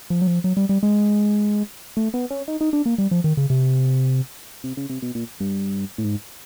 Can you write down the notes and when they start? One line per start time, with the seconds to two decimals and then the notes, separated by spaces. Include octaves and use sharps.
0.10 F3
0.22 F#3
0.27 F3
0.44 F#3
0.57 G3
0.69 G3
0.83 G#3
1.97 A3
2.14 B3
2.30 C#4
2.48 D#4
2.61 D#4
2.73 D4
2.86 A#3
2.98 G3
3.11 F3
3.24 D#3
3.37 C#3
3.50 C3
4.64 C3
4.77 C#3
4.90 C3
5.02 B2
5.15 A#2
5.40 G2
5.98 A2
6.04 G#2